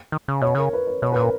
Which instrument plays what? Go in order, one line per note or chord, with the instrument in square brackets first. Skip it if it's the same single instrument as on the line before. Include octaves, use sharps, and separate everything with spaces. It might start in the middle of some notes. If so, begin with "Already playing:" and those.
[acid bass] D#3
C#3
[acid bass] B2 [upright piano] C#5
[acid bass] C#3 [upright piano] A#4
[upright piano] B4
B4
[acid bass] B2 [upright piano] C#5
[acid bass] A#2 [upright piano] B4
[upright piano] A#4